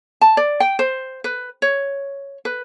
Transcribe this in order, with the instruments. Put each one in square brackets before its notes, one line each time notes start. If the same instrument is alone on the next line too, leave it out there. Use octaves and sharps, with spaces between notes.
[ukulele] A5
D5
G5
C5
B4
C#5
B4